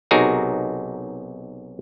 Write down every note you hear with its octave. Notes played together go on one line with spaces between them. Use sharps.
B1 C3 D#4 F#4 G#4 A#4